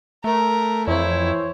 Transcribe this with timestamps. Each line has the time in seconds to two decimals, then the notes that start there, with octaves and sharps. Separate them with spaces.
0.24 A3 A#4
0.87 F2 E3 E4 C5 C#5